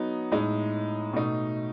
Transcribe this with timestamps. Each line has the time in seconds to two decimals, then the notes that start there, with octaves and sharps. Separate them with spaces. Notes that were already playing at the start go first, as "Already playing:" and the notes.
Already playing: F#3 B3 D#4
0.32 A2 G#3 D#4
1.13 B2 A3 D#4